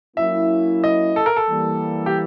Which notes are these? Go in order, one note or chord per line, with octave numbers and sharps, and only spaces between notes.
F#3 A#3 C#4 E4 E5
D#5
A4
A#4
A4
E3 G3 A#3
G4